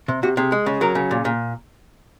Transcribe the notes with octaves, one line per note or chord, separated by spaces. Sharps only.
C3
C3 F#4
C3 G#4
G#3
C#3
F#3 A#4
C#3
A#2
A#2